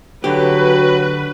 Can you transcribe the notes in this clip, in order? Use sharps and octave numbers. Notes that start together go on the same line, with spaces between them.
D3 F#3 F#4 G4 B4